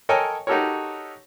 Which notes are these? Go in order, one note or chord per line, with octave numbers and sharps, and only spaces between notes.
A4 A#4 C#5 D#5 G5 G#5
D#4 F#4 G4 A4 A#4 C#5